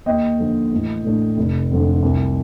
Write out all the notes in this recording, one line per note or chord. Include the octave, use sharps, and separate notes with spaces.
D#2 D#5 G5
D3 F3
A1
A2 A3 D4
F1
F2 D3 F3
C2